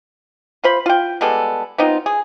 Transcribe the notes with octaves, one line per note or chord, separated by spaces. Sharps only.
F4 C5 B5
F4 G5
G3 G#3 B3 A4
B3 C4 D#4 F4
G#4